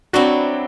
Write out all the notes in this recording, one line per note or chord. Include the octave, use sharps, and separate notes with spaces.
F#3 C4 D4 E4 F#4